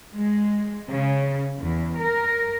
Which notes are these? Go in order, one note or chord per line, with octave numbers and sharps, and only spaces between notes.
G#3
C#3
E2
A#4